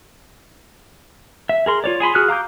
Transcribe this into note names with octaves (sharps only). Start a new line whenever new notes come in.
E5
G#4 A#4 C6
F4 C#5 D5
G#4 G#5 B5 C6
F#4 G#4 D#6 F6 F#6
F5 A#5 D6 G6